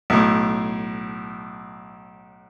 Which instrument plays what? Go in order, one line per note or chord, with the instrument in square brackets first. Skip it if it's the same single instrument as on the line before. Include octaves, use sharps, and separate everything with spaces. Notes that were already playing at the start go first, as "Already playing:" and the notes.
[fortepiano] B1 A2